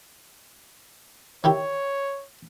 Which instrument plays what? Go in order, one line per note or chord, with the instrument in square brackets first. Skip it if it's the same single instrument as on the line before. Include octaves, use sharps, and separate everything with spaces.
[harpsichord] D#3 E4 G4 [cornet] C#5